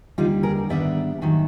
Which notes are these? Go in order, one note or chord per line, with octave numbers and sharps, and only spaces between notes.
D#2 D3 G3 D#4 F4
G#4 A#4
G#2 D#3 G3 B3 D4 D5 E5
G#2 D#3 F#3 A3